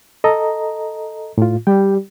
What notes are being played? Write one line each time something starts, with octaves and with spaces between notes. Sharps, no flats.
A4 D#5 A#5
A2 F4
G3 G5